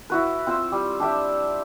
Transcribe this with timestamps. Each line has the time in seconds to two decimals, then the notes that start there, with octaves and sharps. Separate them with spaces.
0.10 E4 F#4 B4
0.46 C4 F4 C5 E6
0.72 G3
1.00 D4 G4 E5 G5